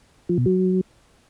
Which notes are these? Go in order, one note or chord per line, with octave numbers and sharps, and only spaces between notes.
F3
B2
F#3